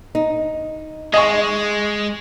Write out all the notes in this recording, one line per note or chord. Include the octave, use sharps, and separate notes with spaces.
D#4
G#3 D#5 G#5 C#6